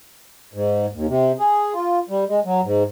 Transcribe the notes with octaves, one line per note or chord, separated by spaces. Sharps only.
G#2
D#2
C3
G#4
F4
G3
G#3
F#3
G#2